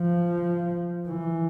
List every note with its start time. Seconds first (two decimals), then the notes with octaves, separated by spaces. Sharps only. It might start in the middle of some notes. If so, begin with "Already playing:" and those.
Already playing: F3
1.08 E3